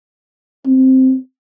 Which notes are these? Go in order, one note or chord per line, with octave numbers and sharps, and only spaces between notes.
C4